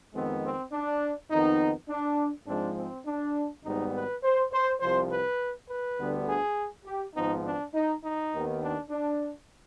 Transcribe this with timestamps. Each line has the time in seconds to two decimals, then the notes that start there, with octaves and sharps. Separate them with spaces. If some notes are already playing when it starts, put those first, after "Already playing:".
0.12 F2 D#3 G#3 B3 C4
0.42 C4
0.71 D4
1.30 F2 D#3 B3 D#4
1.88 D4
2.47 G#2 F3 G#3 C4 D4
2.76 C4
3.05 D4
3.64 G#1 G#2 G3 B3 D#4
3.93 B4
4.22 C5
4.52 C5
4.80 C2 C3 F3 C5
5.10 B4
5.69 B4
5.98 D2 D3 G3 B3
6.27 G#4
6.85 G4
7.14 G#1 G#2 F3 B3 D#4
7.43 D4
7.73 D#4
8.02 D#4
8.31 D#2 D#3 B3
8.60 D4
8.89 D4